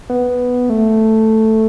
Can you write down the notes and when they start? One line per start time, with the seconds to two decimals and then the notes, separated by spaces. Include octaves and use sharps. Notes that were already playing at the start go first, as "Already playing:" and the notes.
0.10 B3
0.70 A3